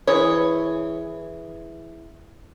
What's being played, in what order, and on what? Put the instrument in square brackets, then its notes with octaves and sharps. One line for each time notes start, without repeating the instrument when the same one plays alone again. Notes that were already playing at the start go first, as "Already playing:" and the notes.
[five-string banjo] E3 G#4 C#5